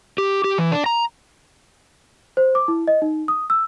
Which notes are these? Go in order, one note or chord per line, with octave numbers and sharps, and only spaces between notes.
G4
G4
E3
D4
A#5
C5
D6
E4
D#5
D#4
D#6
E6